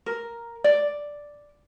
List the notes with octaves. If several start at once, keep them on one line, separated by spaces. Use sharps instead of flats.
A#4
D5